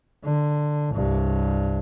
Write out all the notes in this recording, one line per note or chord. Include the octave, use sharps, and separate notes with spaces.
D3
C2 G2